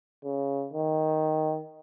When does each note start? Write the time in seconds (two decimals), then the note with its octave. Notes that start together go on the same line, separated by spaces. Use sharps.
0.24 C#3
0.73 D#3